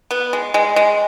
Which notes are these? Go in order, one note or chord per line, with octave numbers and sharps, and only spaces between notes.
B3
G#3
G#3
G#3